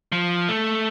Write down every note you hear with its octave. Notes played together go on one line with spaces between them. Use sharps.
F3
A3